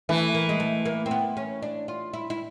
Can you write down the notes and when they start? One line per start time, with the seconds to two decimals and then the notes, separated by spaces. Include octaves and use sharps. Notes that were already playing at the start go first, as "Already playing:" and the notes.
0.09 E3 A3
0.34 A#3
0.49 G#3
0.60 A3
0.85 A#3
1.06 C4
1.11 B3
1.37 C#4
1.62 D4
1.88 F4
2.13 E4
2.30 E4